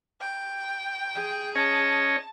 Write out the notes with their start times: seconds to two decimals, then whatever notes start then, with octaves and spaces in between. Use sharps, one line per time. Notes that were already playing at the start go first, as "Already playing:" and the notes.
0.20 G5
1.15 G#4
1.55 C#4 C#5 D#5 A5